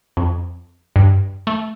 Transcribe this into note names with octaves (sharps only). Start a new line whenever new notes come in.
F2
G2
A3